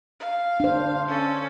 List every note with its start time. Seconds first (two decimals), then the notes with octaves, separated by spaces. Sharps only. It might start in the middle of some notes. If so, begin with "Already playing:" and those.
0.20 F5
0.60 D4 C5
1.08 C#4 A4